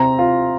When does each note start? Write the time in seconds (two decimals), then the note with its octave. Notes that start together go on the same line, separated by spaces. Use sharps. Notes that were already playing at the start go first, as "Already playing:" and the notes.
Already playing: C3 C4 A#5
0.19 F4